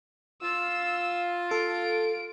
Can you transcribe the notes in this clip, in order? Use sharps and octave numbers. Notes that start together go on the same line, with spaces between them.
F4 E6
A4 D7